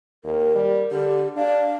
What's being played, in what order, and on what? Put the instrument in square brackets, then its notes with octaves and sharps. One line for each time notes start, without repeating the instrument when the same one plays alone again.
[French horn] D#2 [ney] A#4
[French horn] G3
[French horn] D3 [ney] G4
[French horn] D4 [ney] F5